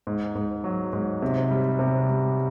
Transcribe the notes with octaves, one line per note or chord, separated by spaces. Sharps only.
G#2
G#2
F#3
G#2
C3
G3
C3
G3